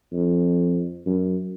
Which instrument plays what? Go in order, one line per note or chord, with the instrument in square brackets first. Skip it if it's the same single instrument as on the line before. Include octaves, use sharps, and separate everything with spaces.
[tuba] F2
F#2